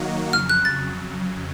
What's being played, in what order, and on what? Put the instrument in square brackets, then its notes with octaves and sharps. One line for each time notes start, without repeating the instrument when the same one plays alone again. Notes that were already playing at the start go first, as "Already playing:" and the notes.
Already playing: [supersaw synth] D#3 F#3 A#3 D#4 F#4
[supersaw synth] F2 C#3 F#3 [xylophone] F6
[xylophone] F#6
A6